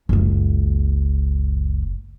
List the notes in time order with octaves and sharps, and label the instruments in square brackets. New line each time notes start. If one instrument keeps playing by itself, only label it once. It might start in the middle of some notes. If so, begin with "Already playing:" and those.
[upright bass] F#1 C#2